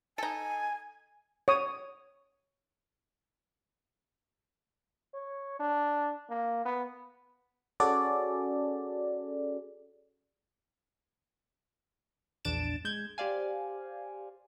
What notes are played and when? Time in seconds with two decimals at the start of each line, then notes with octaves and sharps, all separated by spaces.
0.18 D#4 A4 G#5
1.48 C#5 D#6
5.14 C#5
5.59 D4
6.29 A#3
6.65 B3
7.80 C#4 F#4 G#4 A4 D5
12.45 A#1 E2 D4 A6 D7 E7
12.84 G#3 G6 G#6
13.18 G4 C5 D5 F5 G#5